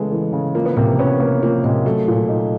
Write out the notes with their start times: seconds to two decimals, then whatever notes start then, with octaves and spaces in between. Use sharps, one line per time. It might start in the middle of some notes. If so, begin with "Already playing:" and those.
Already playing: C#3 E3 G#3 A3 B3
0.12 E3
0.33 C#3
0.55 F3 A#3
0.66 B3
0.77 C3 A#3
0.99 B3 C#4
1.20 A#3 B3
1.42 F3 A#3
1.64 C3 G#3
1.85 F#3 A3
2.08 A#2
2.29 D#4